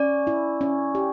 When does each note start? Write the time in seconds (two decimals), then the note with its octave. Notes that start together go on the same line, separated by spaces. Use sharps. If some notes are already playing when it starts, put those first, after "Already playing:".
Already playing: C#4 D5
0.27 E4
0.61 C#4
0.95 G4